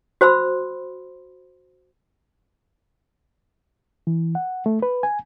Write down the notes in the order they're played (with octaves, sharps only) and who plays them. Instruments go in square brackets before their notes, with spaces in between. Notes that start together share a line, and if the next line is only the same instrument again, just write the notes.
[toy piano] F#4 C5 B5 C6 E6
[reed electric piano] E3
F#5
A3
B4
G#5